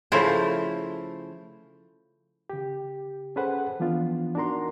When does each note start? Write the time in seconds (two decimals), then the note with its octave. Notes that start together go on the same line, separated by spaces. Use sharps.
0.12 C#3 F3 A3 E4 C5
2.50 C#3 G4
3.36 C#4 G#4 A4 B4 C5 F#5
3.80 E3 F3 B3 D4 F4
4.35 D4 D#4 F#4 A#4 A#5 C6